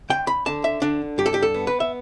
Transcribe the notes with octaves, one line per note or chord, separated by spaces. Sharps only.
D2 G5
B5
D3 A5
E5
D3 D4
G2 G4
A4
G4
A4
B3
B4
E5